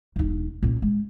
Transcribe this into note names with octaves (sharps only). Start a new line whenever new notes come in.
E1 D#4
A#2 C#4
G#3